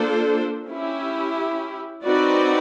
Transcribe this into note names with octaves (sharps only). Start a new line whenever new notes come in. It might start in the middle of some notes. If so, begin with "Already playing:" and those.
Already playing: A#3 D4 F4 A4 C5
C#4 E4 G4
C4 D#4 F#4 B4 D5